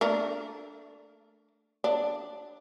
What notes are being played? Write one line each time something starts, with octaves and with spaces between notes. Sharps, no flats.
A3 D4 A#4
D4